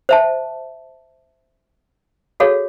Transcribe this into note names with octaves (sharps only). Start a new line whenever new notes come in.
C5 E5 A5
F#4 G#4 A4 C#5 F5